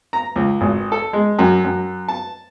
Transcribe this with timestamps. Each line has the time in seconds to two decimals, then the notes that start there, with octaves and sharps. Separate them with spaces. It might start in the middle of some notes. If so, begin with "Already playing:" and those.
0.13 A#5
0.36 C#2
0.61 G#1
0.92 A4
1.13 G#3
1.39 F#2
1.64 F#2
2.08 A5